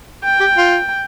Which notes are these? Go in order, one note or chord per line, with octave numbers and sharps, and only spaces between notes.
G5
G4
F4